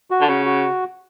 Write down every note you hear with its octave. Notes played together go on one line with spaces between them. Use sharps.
F#4
D3
C#3 F#4
F#4